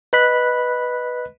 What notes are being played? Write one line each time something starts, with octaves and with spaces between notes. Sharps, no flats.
B4 D#5 B5 F#6 B6